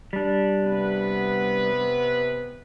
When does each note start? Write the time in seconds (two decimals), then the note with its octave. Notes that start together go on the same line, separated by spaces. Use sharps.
0.13 G3 D4
0.62 C3 B3 B4